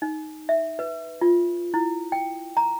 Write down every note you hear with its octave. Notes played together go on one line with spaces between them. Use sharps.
D#4
E5
B4
F4
E4
G5
A#5